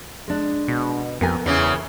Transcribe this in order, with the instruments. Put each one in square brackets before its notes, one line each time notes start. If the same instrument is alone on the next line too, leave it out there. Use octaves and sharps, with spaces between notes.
[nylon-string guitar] G#3 D4
[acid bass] B2
[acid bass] F2 [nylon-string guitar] B3 A#4 G#5
[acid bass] E2 [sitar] C#3 E3